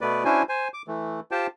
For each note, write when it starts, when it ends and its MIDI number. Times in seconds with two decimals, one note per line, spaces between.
0.01 0.24 47
0.01 0.24 57
0.01 0.24 59
0.01 0.24 71
0.01 0.24 74
0.25 0.43 61
0.25 0.43 62
0.25 0.43 64
0.25 0.43 66
0.25 0.43 72
0.25 0.43 80
0.49 0.68 72
0.49 0.68 80
0.74 0.82 86
0.88 1.20 52
0.88 1.20 57
1.31 1.47 65
1.31 1.47 67
1.31 1.47 72
1.31 1.47 79
1.31 1.47 81